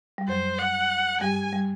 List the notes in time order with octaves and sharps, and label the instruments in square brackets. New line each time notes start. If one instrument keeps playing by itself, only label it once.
[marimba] G3
[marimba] F#2 F#3 [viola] C5
[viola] F#5
[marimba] G2 G3 [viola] G#5
[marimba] G3